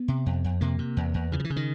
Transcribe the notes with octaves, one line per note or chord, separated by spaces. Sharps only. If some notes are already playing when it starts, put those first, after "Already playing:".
Already playing: B3
C3
F2
F2
C3 A#3
C3
E2
E2
C#3 E3
F3
E3
C#3
D#3